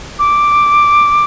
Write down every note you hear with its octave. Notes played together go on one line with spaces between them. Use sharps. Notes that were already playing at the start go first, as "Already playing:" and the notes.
D6